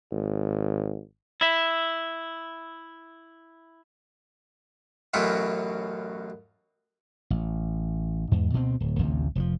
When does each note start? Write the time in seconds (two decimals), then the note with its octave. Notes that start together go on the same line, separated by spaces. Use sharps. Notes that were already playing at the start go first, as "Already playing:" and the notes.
0.11 G#1
1.41 E4 E5
5.13 A1 F#2 B2 C#4 F4 E5
7.30 A1
8.32 E2 G#2
8.53 D2 B2 B3 C4
8.80 D1
8.99 A1 D2 C3
9.35 F1 C3 F3